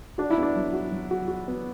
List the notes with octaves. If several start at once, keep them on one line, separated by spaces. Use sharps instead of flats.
D4 F#4
E4
B3 D4
F#3
F#4
F#3
F#4
F#4
B3